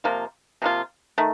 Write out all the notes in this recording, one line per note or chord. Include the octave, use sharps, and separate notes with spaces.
C3 F3 A#3 F4
C3 F3 A#3 F4
D#3 A3